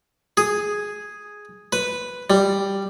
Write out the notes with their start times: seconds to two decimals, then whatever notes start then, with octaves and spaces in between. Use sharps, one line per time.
0.37 G#4
1.73 B4
2.30 G3